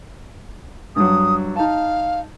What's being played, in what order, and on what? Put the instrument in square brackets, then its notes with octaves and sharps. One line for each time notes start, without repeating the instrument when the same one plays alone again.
[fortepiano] G2 F#3 [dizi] D#6
[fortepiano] D#4 A5 [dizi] F5